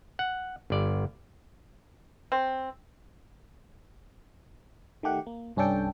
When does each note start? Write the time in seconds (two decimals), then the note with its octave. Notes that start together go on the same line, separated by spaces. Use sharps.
0.19 F#5
0.70 G1 D5
2.32 C4
5.03 D#3 A3 G4 F#5
5.27 A#3
5.56 C2 G2 C#4 D4 A4 G5